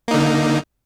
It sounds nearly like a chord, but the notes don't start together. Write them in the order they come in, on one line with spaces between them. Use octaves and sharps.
A#3 D#4 D3